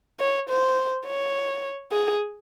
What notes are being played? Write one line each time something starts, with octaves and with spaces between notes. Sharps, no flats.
C#5
C5
C#5
G#4